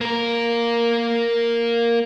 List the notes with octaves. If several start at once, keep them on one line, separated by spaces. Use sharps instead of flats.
A#3 A#4